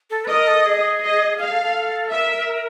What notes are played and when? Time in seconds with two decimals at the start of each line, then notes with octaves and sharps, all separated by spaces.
0.10 A4
0.25 B4
0.28 A#4 D#5
0.47 A4
0.65 G#4
1.02 D#5
1.38 G#4 F5
1.51 A4
1.63 A4
2.11 A#4 E5